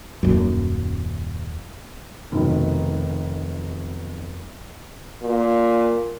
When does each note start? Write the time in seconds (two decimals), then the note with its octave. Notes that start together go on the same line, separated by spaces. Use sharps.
0.23 D#1 F#2
2.32 F1 B1 D#3
5.22 A#2